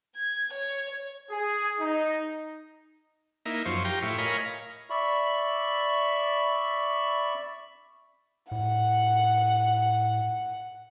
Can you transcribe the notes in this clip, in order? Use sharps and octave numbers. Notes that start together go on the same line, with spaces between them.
G#6
C#5
G#4
D#4
A#3 D#4 E4
F#2 F3 C5 C#6
F4 G4 G5 A#5
A2 E4 F4 C#6
A#4 C#5 D#5 F5 G#5 B5
D5 E5 B5 C#6
A2 F#5